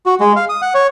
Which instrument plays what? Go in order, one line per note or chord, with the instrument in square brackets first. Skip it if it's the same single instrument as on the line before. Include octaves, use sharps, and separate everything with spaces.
[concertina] F#4
G#3
F5
D#6
F#5
C#5